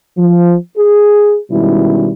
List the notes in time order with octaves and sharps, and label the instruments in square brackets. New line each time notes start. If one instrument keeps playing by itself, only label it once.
[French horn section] F3
G#4
B2 D#3 G3 G#3 C#4 E4